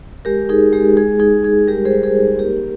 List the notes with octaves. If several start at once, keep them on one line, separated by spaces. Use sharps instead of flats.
G#3 G4 A#4
D#4 G#4
G#3 G4
G#3 G#4
D#4 G#4
G#3 G#4
G3 G4 A#4
G#4 C5
G3
G#4 C5
D#4
A#3 G4 A#4